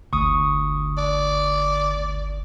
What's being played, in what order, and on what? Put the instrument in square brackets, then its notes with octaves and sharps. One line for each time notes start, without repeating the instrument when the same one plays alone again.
[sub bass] G1 [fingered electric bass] D2 [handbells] C#6 D#6
[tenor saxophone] D5